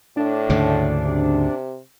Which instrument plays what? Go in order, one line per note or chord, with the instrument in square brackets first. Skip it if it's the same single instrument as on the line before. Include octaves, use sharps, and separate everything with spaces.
[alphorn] A2 [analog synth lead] D4
[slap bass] D2 G#2 C#3
[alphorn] C3